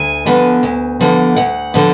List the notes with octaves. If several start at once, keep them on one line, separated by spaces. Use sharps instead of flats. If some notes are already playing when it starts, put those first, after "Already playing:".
Already playing: D2 G#5
D3 F3 B3
D2
D3 F3 B3
D2 F#5
D3 F3 B3